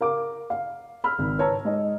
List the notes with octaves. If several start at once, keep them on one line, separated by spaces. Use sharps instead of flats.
A#4 F5 D6
F5
B5 E6 F6
G#1
B4 C#5 A5 A#5 E6
G#2 D#5